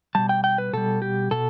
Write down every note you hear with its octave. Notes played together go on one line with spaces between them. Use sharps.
B2 G3 A5
G5
G5
B4
B2 G3 A4
G4
B2 A4